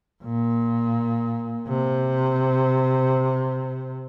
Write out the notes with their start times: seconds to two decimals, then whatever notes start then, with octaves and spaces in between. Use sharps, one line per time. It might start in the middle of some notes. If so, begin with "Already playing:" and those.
0.24 A#2
1.68 C3